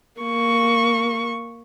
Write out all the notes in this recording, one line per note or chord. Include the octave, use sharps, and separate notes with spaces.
A#3 C#6